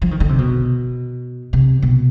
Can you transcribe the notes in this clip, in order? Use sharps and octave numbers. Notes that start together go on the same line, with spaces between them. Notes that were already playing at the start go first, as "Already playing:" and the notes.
F3
D#3
D3
C3
B2
C3
B2